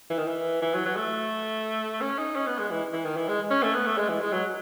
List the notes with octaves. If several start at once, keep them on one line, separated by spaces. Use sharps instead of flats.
E3
D#3
E3
E3
F#3
F#3
A3
C#4
D#4
C#4
B3
G#3
E3
E3
D#3
E3
G#3
C#4
A3
B3
A3
G#3
E3
G#3
F#3